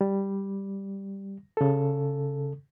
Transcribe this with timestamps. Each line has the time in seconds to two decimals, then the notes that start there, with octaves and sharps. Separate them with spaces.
0.01 G3
1.57 C#3 A4